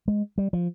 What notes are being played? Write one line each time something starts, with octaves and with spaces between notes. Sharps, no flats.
G#3
G3
F3